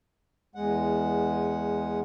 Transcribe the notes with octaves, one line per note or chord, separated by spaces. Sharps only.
E2 G#3 F#5